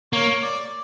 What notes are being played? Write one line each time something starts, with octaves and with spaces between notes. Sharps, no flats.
A#3 C#5
D5